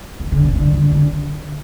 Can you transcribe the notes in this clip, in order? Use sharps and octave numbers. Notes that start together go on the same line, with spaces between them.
E3
D3
C3
D3
D3
D3